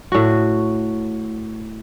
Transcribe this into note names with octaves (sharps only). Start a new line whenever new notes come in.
A2 F#4